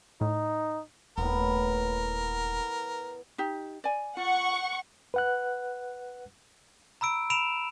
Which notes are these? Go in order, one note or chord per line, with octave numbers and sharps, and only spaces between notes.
A2 D#4
D#1 A2 B3 A#4
D#4 G4
D5 G#5
F4 F#5 C#6
B4 F#5 F#6
A#5 B5 E6 D7
B5 D7 E7 F7